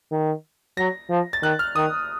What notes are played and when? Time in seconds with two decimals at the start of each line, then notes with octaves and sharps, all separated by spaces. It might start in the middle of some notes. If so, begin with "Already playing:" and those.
0.12 D#3
0.77 F#3 A#6
1.10 F3
1.33 A6
1.42 D#3 F#6
1.59 F6
1.76 D#3 D#6